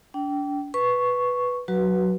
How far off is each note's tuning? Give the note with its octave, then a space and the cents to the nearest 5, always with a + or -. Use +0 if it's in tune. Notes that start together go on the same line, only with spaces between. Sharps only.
D4 -30 G5 -20
B4 +0 C#6 +0
F#3 -5 F#4 +15 B4 -10